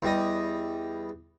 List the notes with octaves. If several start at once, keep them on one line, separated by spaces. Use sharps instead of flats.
E2 G3 D#5